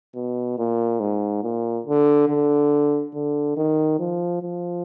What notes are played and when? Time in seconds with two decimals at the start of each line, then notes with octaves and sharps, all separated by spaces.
0.15 B2
0.58 A#2
1.00 G#2
1.43 A#2
1.86 D3
2.29 D3
3.14 D3
3.57 D#3
3.99 F3
4.43 F3